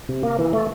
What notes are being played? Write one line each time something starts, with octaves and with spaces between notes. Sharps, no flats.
C3
A#3
E3
A3